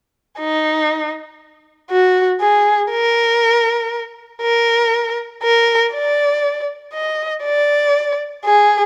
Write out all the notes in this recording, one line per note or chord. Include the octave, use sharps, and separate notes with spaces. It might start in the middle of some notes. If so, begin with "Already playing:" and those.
D#4
F#4
G#4
A#4
A#4
A#4
D5
D#5
D5
G#4